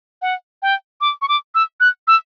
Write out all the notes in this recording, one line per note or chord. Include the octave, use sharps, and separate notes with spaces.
F#5
G5
D6
C#6
D6
E6
F#6
E6